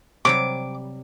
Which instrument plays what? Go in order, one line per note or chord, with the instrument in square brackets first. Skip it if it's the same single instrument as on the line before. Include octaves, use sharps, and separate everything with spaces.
[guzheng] C3 F#3 G3 [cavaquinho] D6